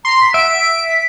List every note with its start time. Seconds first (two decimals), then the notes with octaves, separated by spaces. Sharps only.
0.05 A#5 C6
0.21 B6
0.34 E5 F#5 D7
0.58 B6